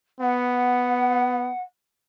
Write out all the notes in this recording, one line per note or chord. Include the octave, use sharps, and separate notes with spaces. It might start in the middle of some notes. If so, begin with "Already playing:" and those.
B3 F#5